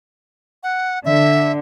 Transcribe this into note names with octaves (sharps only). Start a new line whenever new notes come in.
F#5
D3 E5